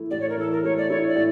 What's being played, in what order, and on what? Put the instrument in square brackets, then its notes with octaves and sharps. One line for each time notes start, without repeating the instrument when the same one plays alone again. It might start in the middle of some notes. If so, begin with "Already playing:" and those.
Already playing: [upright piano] E3 A3 E4
[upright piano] A2 [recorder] D5
[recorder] C#5
A#4
[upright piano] E3 [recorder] A4
[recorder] A#4
[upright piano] A3 [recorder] C#5
[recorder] D5
[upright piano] E4 [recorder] C#5
[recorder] D5
[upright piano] A2